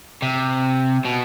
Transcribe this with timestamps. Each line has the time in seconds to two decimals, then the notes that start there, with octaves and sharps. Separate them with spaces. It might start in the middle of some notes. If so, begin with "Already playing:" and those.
0.22 C3
1.05 B2